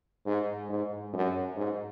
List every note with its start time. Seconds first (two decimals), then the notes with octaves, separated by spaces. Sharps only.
0.26 G#2
0.69 G#2
1.13 F#2
1.56 G#2